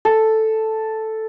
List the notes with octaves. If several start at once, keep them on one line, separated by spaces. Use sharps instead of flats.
A4